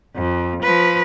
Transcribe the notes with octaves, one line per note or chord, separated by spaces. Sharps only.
F2
F3 B4